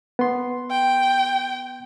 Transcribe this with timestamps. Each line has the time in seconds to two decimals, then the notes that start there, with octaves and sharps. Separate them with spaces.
0.19 B3 C6
0.71 G5